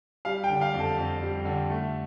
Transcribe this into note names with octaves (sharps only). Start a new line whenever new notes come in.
G3 F5
G5
D3
F5
F2
A4
F2
G3
D3
A3